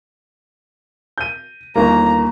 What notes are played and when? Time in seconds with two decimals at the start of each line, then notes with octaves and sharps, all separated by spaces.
1.18 G6 D#7
1.76 G1 D#2 A#3 A#5